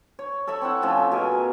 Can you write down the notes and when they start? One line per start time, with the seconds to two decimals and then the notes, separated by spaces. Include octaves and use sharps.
0.19 C#5
0.47 A4 C#5 E5 B5
0.62 C4 E4 F#5
0.82 F3 A3 C#4
1.12 B2 G#4 A#4 G#5